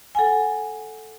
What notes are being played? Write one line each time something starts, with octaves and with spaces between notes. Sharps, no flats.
A4 F#5 G#5